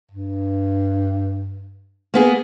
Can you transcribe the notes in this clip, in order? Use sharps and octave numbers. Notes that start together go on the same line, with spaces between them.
G2
A#3 B3 G#4